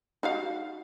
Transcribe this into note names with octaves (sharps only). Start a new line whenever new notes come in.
D#4 F#4 F5